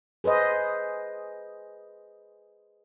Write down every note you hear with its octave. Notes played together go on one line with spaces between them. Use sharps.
G#4 B4 C5 D#5